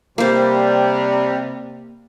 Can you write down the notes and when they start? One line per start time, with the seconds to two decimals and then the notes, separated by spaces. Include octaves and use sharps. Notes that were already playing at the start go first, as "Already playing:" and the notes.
0.18 C3 G3 A#3 C5